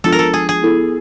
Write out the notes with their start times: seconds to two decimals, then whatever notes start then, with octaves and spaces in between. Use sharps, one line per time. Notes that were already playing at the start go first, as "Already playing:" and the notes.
0.04 F3 G#3 B3 D4 F4 A4
0.12 A#4
0.19 A4
0.34 G#4
0.49 G#4
0.63 B3 E4 A4